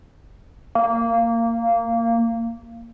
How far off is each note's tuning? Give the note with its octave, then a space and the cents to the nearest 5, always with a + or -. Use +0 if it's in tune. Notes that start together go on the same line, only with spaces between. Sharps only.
A#3 -15